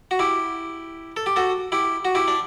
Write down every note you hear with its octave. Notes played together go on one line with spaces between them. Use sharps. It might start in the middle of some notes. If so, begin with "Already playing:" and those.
F#4
E4 G4
A4
G4
F#4 A4
E4 G4
F#4
E4 G4
D4